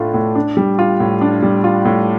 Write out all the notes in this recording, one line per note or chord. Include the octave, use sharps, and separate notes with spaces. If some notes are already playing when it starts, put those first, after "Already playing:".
Already playing: A2 A3 D4 F4
A2
D4
G3
F4
A2
D4
G3
F4
A2